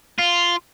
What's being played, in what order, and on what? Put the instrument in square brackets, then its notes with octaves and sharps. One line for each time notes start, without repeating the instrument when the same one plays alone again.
[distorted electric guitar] F4